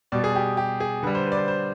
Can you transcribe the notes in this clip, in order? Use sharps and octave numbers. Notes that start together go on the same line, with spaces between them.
B2 G3 D5
G#4
G4
G4
G#4
D3 G3 B4
C5
B4
D5
C5
C5